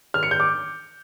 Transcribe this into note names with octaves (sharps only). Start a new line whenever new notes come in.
F6
C#7
G6
D6